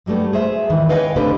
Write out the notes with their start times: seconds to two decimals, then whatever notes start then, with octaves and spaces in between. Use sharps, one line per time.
0.06 G2 F#3 G3 A3 B3
0.33 G#4 C5 E5
0.69 E2 G#2 D#3 E3
0.89 B4 C#5 D#5 F5 G5 G#5
1.16 D2 A2 D3 C4 G4 B4